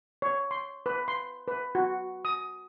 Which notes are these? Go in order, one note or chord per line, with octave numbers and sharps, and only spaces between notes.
C#5
C6
B4
C6
B4
F#4
D#6